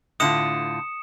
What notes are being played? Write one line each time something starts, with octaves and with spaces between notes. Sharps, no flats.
A2 D3 F4 D#6 C#7 E7